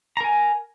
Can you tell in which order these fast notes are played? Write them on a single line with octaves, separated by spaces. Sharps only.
A#5 A#4 G#5